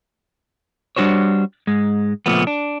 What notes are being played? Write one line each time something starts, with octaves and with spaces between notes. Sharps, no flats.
G3 D4 F#4 C5 C#5
G#2 G#3
C#2 A#2 F3 A3 B3
D4